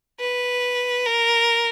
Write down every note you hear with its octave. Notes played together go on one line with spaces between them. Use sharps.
B4
A#4